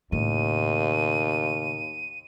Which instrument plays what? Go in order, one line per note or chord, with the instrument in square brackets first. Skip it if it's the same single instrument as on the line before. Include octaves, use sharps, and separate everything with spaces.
[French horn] D#2 [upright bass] A2 C#3 [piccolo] D#7